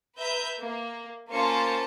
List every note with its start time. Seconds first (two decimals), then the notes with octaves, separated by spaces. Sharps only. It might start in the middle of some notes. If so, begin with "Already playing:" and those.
0.16 B4 E5 A#5 G6
0.60 A#3
1.30 A#3 C#4 F4 C5 A5 C#7